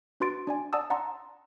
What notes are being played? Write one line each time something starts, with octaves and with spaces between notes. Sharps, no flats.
D4 F#4 B4 C6 A6 D7
D4 D5 G#5
D5 F#5 G#5 A5 D#6 E6
D5 F#5 A5 A#5 C6